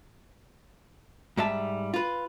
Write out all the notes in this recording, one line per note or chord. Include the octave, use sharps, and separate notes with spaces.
G#2 G3 E5 A5
F4 B4